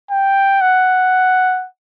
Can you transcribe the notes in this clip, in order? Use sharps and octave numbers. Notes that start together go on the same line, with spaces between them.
G5
F#5